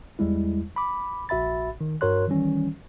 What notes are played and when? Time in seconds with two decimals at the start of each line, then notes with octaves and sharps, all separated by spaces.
0.19 E2 G3 G#3 E4
0.76 B5 D6
1.29 A#1 F#4 E5 B5 A6
1.81 D#3
2.01 G2 F#4 A#4 C#5 C6 F#6
2.28 D#3 E3 G3 C#4